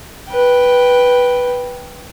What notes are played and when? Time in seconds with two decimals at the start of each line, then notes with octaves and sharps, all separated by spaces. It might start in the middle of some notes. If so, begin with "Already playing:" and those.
0.29 B4 G5